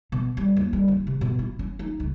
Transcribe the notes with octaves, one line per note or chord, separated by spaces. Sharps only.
B2
G3
D#2
G3
D#3
C3
B2
E4
C#4
D#4
C#2